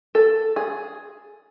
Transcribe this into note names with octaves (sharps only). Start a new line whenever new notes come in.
A4
G#4